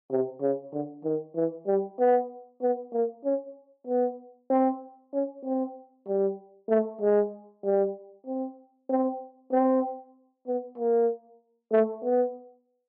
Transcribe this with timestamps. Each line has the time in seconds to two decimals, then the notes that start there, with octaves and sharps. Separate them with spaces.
0.11 C3
0.41 C#3
0.73 D3
1.04 D#3
1.36 E3
1.67 G3
1.99 B3
2.62 B3
2.93 A#3
3.25 C#4
3.87 B3
4.50 C4
5.13 C#4
5.45 C4
6.08 G3
6.70 A3
7.02 G#3
7.64 G3
8.27 C4
8.90 C4
9.53 C4
10.47 B3
10.78 A#3
11.73 A3
12.04 B3